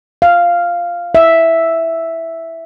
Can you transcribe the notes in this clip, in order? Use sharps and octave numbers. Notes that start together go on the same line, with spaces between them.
F5
E5